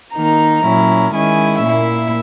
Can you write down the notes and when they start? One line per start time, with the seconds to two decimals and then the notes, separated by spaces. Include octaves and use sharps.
0.15 D#3 A#3 D#4 A#5
0.64 A#2 F#3 C#4 E4
1.13 D#3 G#3 C#4 E4 G#5
1.63 A#2 A#3 E4 E5